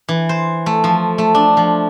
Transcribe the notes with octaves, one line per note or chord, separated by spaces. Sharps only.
E3
C5
A3
F3
A3
D4
F3